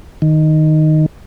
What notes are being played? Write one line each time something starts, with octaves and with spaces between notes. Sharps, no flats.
D#3